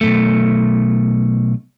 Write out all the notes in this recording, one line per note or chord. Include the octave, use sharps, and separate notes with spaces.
B1 G2 A3